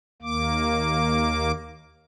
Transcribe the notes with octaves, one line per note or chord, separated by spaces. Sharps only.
D#2 A#3 D6